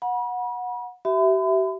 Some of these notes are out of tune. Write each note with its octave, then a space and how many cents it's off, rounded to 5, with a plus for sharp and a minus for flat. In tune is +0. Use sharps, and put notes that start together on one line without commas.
F#5 -20 B5 -40
G4 -40 E5 +0 B5 +40